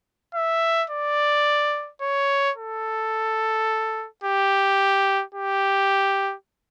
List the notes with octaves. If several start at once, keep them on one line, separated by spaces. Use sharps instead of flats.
E5
D5
C#5
A4
G4
G4